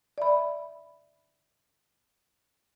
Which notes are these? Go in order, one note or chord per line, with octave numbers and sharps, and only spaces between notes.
D5 E5 B5